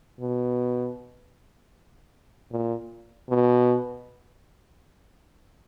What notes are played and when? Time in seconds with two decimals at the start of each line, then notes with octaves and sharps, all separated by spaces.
0.20 B2
2.51 A#2
3.29 B2